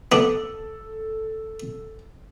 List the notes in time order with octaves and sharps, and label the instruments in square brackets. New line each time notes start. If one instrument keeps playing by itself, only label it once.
[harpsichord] B3 D4 [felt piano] A4